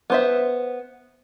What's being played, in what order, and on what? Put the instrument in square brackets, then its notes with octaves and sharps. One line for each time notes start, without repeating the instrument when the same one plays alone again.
[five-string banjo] B3 C5 E5